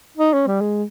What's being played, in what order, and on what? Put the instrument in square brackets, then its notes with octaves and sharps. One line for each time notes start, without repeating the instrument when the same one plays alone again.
[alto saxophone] D#4
C#4
G3
G#3